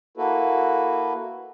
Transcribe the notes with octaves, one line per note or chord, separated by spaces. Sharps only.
A#3 E4 F#4 A4 B4